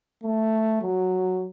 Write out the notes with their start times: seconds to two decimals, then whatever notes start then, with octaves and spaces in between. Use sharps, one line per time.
0.24 A3
0.82 F#3